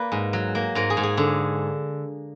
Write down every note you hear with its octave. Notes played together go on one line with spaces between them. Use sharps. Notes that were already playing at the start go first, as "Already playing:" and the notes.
Already playing: A#3 B4 D5
G#2
F#3
A#3
G#2 A#4
G#4
G#2
G#4
D3